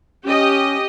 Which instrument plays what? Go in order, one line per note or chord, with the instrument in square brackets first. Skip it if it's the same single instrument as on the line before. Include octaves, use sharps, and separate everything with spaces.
[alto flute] C#4 [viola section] G4 D#5